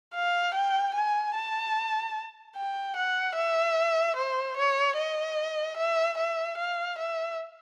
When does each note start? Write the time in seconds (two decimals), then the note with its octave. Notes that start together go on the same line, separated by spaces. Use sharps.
0.15 F5
0.54 G5
0.95 G#5
1.35 A5
2.56 G5
2.96 F#5
3.36 E5
4.16 C5
4.57 C#5
4.97 D#5
5.77 E5
6.17 E5
6.58 F5
6.98 E5